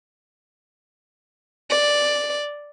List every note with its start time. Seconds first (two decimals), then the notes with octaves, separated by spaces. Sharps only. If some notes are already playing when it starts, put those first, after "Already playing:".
1.70 D5